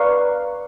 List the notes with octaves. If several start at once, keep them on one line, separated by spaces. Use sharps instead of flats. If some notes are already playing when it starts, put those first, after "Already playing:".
Already playing: B4 D5 F5 A#5 C#6